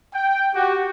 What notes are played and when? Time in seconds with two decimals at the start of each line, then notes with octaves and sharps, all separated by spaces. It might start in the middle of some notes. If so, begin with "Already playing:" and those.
0.14 G5
0.55 F#4 G4